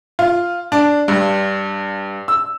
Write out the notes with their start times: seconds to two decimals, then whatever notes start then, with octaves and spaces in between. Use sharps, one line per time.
0.19 F4
0.72 D4
1.08 G2
2.28 E6